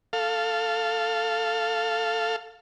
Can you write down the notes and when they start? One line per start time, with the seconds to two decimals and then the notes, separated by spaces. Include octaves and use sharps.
0.13 A4 F5